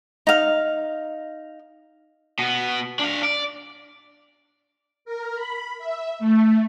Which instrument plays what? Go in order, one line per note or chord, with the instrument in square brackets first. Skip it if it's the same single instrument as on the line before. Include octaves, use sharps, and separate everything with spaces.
[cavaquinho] D#4 F5
[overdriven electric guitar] B2 B3
D4 F5
D5
[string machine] A#4
B5
E5
A3